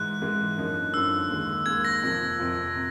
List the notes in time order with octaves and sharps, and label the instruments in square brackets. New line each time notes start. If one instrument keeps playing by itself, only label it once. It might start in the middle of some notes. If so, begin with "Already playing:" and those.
Already playing: [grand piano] G#2 E3 G#3 [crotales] F#6
[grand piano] G#2 E3 G#3
F#2 D3 F3 A#3 D#4
[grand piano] F#2 D3 F3 A#3 D#4 [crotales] E6
[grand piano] D#2 D#3 G#3
[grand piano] D#2 D#3 G#3 [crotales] G#6
[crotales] A#6
[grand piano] F2 C3 F3 A#3
F2 C3 F3 A#3
C3